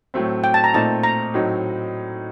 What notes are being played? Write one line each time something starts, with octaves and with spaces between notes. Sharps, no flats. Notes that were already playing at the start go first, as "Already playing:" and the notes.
A2 F#3 A3 C4
G5
A5
A#5
A#2 A3 C4 D#4 A5
A#5
A2 F#3 C4 D#4